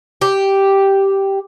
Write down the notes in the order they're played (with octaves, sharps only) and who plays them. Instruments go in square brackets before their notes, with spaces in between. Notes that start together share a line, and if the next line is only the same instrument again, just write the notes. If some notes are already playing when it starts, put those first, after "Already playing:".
[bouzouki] G4